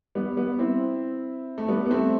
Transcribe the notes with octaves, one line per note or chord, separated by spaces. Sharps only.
G3 B3
G3 B3
C4 E4
A3
G3 B3
B3
A3 C4